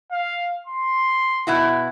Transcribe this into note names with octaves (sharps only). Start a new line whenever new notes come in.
F5
C6
B2 E4 F#4